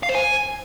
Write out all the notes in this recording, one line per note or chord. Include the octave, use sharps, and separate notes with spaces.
F5
C5
G#5